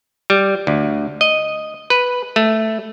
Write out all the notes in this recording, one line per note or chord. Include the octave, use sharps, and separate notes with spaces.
G3
D2
D#5
B4
A3